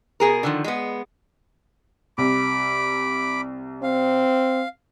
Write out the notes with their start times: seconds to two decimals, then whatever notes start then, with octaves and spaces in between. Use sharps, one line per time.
0.20 B2 G#4 A#4
0.43 D3 D#3 F3
0.64 G#3 B3
2.18 C2 B5 D6
3.83 C4 F5